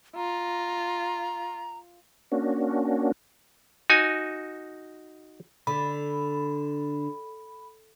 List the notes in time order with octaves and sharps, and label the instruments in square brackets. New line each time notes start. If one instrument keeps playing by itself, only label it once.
[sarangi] F4 [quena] A#5
[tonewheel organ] A#3 C#4 D4 F#4
[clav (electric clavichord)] D#4 F#4 G#5
[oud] D3 [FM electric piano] B5